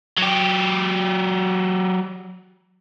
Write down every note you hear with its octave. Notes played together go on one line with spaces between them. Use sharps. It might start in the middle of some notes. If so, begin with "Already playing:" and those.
F#3 G4